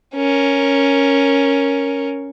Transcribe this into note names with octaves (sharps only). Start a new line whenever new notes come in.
C#4 A#4